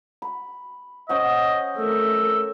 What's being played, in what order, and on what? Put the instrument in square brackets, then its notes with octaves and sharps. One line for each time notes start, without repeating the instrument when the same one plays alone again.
[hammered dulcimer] B5
[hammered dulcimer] C#4 C5 F#5 [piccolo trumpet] D#5
[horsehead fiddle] A3 A#4 [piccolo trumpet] E6